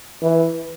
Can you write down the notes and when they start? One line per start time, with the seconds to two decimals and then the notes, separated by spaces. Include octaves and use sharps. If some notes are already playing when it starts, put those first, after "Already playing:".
0.22 E3